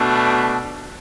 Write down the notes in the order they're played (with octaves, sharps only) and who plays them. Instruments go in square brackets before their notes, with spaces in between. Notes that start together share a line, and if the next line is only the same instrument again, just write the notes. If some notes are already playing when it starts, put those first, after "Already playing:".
Already playing: [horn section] B2 A3 D4